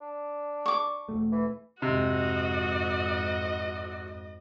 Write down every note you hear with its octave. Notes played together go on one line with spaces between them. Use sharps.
D4
C#6 D6
E1 A3
E3
F2 G#2 C3 F#4 D#5